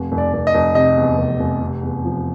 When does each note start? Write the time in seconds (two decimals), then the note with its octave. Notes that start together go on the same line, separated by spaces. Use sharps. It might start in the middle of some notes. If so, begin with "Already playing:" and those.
Already playing: F1
0.12 F1
0.18 D5
0.33 F1
0.47 D#5
0.54 F1
0.75 C3 D#5
0.97 E2
1.18 F1
1.40 F1
1.61 C3
1.83 E2
2.04 F3